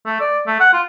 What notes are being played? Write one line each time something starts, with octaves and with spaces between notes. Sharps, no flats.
A3
D5
A3
F#5
F4